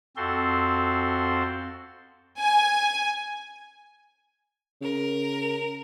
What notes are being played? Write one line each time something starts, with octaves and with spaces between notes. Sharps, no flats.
F2 C4 F#4 A4 C6
G#5
C#3 A#4